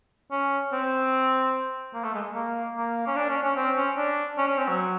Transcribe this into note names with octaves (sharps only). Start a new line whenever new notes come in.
C#4
C4
A#3
A3
G#3
A#3
A#3
C#4
D4
C#4
C#4
C4
C#4
D4
C#4
C#4
C4
F#3